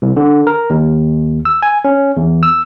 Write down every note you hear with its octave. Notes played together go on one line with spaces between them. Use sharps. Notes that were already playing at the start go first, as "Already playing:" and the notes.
C2
D3
A#4
D#2
E6
G#5
C#4
E2
E6